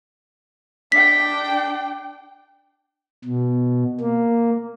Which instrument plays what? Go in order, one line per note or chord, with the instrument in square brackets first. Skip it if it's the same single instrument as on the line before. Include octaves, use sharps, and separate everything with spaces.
[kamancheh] D4 G5 [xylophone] B6
[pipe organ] B2
A#3